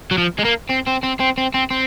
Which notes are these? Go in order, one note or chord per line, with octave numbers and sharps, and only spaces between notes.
F#3
F3
G#3
A#3
C4
C4
C4
C4
C4
C4
C4